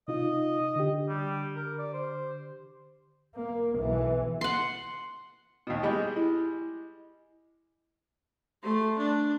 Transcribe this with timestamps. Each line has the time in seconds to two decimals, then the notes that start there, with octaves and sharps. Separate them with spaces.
0.08 C3 D#4 F4 D#5
0.76 D3 G4
1.09 G3
1.56 A#4
1.79 D5
1.93 C5
3.35 A#3
3.76 B1 E3
4.41 F#5 C6
5.67 D#2 B2
5.83 G3 G#3 G4
6.17 E4
8.63 A3 C6
8.98 D4